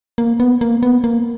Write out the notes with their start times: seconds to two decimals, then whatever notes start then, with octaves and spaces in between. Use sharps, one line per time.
0.18 A#3
0.40 B3
0.61 A#3
0.83 B3
1.04 A#3